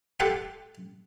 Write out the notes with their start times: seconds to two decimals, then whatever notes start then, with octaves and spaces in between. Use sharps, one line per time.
0.20 G4 A4 F#5 G5 C6